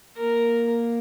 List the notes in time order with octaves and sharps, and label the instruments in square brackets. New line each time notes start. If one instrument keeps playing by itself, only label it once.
[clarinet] A#3 [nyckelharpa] A#4